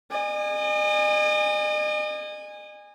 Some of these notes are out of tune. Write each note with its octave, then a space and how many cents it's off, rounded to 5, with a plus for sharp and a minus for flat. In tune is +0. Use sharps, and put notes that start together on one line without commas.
D#5 -40 G#5 -20